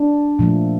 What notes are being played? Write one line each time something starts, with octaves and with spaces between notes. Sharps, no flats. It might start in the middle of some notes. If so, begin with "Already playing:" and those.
Already playing: D4
A#2 F3 A3